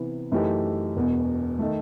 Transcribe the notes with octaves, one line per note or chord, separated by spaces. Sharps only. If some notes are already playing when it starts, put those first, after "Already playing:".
Already playing: C3 E3 B3 E4 B4
F#2 E3 A3 D#4 G4
E1 E2 B2
D#3 A3